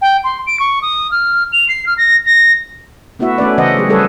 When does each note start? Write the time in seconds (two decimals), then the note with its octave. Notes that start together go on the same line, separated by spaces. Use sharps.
0.02 G5
0.24 C6
0.47 D7
0.60 C#6
0.82 D#6
1.11 F6
1.52 F7
1.69 C7
1.86 F6
1.98 A#6
2.26 A#6
3.19 A3 B3 E4 F#4 E5
3.38 A3 C#4 B4 D5
3.58 C#3 E3 C5 D#5 F#5
3.76 F#3 A3 G4 G#4
3.89 G3 G#3 G#4 A4 B4 C#5